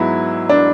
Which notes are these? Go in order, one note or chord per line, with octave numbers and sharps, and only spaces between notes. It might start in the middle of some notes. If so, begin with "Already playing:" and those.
Already playing: G#2 F#3 B3 E4
D4